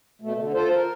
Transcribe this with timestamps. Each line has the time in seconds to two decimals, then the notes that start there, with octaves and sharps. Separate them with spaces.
0.22 B2 A3
0.39 D3
0.54 F4 A4 C5
0.74 A#4